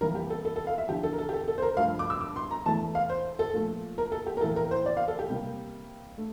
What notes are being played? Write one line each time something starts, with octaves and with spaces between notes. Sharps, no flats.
F2 E3 G3 A#3 A#4
G4
A4
A4
A4
F5
E5
E2 D3 F3 G4
A4
A#4
A4
G4
A4
A4
C5
A#4
G2 F3 A3 F5
D6
E6
D6
C6
A#5
E2 E3 A3 A5
F5
C5
A4
A#2 F3 A3
A#4
A4
G4
A#4
A2 E3 A#3 A4
A#4
C5
D5
F5
A4
G4
C3 G3 A#3
A3